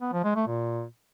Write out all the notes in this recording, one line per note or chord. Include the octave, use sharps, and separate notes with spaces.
B3
F3
G#3
A3
A#2